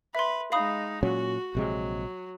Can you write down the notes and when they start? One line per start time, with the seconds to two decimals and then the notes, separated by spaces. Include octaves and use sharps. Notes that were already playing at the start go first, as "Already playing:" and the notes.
0.15 B4 E5 C6
0.52 G#3 D#4 F5 B5 D#6
1.03 A#2 F#3 C#4 F#4
1.55 A#1 C3 F#3 G#3